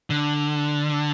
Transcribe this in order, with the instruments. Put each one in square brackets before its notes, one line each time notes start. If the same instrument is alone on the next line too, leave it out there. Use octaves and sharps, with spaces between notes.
[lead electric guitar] D3